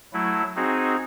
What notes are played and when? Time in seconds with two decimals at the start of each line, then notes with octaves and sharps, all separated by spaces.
0.13 F#3 A3 E4
0.56 C4 D#4 F#4 G#4